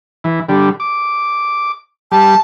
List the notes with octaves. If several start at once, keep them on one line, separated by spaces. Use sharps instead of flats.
E3
D3 G3
D6
G3 A5